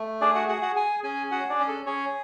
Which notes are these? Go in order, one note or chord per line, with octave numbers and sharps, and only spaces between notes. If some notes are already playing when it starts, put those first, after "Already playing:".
Already playing: A3
D4 G#4 D5
F#4 F#5
F#4 G#4 F#5
F#4 F#5
G#4 G#5
C#4 G#4 G#5
F#4 G#4 F#5
D4 D5
C#4
A4
C#4 G#4 C#5